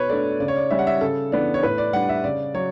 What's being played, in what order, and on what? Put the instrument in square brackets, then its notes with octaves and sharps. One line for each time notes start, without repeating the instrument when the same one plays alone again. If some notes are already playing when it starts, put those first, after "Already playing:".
Already playing: [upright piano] B2 B4 C#5
A3 D4 D5
C#3 D5
C#5
D5
G3 C#4 E5
F#5
E5
C#3 A4
E3 B3 D4 D5
C#5
A2 B4
D5
G3 D4 F#5
E5
C#3 D5
F#3 C#5